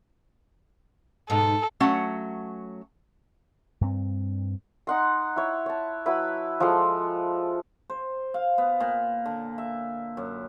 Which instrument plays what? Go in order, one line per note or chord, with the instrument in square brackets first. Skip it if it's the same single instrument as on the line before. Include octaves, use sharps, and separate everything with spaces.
[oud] G#2 B2 D#4 [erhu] A4
[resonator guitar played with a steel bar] F#3 A3 C#4 F#5
[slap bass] G2 C4
[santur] D#4 F#5 C6
E4 C#5
C#5 A5
F#3 E4 B4 B5
F3 G#3 A4 C6
[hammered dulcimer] C5
F5
B3
A#2
D3
E5
F#2